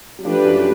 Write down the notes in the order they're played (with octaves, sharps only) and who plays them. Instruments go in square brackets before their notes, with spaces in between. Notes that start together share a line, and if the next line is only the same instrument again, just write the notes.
[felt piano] F#3
[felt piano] F3 [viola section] A3 D4 G4 B4
[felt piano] F#2 F#3
F#3